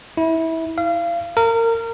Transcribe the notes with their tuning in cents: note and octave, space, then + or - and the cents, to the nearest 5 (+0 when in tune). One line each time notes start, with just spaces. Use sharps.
E4 -20
F5 -30
A#4 -25